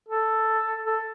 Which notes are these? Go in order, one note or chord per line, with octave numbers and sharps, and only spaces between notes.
A4
A4